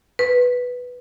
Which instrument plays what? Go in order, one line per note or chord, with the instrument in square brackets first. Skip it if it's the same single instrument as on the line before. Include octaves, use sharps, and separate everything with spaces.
[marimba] B4